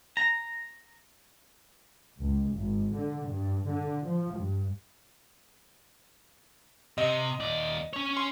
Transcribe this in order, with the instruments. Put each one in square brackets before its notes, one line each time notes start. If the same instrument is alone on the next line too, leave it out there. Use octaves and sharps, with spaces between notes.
[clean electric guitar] A#5
[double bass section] C#2
G#1
D3
G2
D3
F3
G2
[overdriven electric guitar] C3 [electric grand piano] D#5
[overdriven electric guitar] D#2 D5
C#4 C#5
[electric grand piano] C6